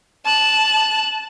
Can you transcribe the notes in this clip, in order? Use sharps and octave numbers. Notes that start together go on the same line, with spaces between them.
A5 F#6